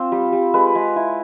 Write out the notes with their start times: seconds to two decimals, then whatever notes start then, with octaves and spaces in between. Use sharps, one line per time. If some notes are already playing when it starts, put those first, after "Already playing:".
Already playing: C4 F4
0.12 G3
0.32 G3
0.54 G#3 B4
0.75 G#3
0.96 E4